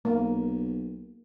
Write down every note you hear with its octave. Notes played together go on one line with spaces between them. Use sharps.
B1 A#3